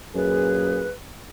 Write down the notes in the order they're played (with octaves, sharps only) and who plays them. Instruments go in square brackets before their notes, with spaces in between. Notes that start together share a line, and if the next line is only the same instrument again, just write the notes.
[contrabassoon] F#2 [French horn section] A#2 A#3 G#4 [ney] B4